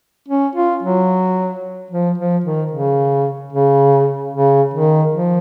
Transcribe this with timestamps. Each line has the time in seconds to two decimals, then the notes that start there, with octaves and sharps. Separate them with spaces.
0.28 C#4
0.56 F4
0.83 F#3
1.91 F3
2.18 F3
2.44 D#3
2.72 C#3
3.53 C#3
4.33 C#3
4.74 D#3
5.14 F3